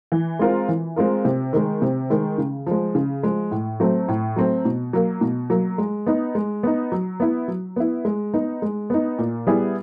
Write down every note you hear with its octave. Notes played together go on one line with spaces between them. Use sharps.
E3
G#3 C4 F4 A#4
E3
G#3 C4 F4 A#4
C3
D#3 G#3
C3
D#3 G#3
C#3
F3 G#3
C#3
F3 G#3
A2
F#3 A3 C4
A2
F#3 A3 C4
B2
F#3 A#3
B2
F#3 A#3
G#3
B3 D#4
G#3
B3 D#4
F#3
B3 E4
F#3
B3 E4
G#3
B3 D#4
G#3
B3 D#4
A#2
G3 B3 E4 G#4